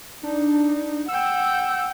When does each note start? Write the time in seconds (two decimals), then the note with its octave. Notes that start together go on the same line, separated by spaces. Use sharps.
0.23 D4 D#4
1.08 F#5 G5 E6